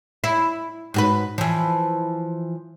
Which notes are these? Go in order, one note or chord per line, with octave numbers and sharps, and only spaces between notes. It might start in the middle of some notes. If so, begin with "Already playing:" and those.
E4
G#2 F#4 B4
E3 F3